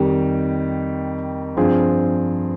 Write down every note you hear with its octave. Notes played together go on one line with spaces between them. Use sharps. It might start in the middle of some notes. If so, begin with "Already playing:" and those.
Already playing: F2 D#3 G3
G2 F3 C4 F4 G#4